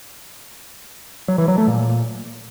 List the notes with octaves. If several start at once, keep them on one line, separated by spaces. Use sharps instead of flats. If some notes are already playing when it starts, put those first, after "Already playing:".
F#3
E3
F#3
A3
A#2